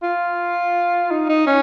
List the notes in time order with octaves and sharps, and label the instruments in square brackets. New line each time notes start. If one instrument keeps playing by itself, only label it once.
[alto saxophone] F4
D#4
D#4
C#4